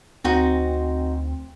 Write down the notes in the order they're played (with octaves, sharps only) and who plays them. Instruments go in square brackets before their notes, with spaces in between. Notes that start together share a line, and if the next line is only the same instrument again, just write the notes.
[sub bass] D2 [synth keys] C4 [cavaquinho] D#4 F#4 C5